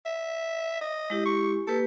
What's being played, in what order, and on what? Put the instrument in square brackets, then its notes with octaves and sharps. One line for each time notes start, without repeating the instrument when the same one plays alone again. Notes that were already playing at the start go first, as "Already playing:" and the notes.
[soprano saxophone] E5
D#5
[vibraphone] G#3 E4 G4
[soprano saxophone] C#6
[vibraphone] A#3 G4 B4 [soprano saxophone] A4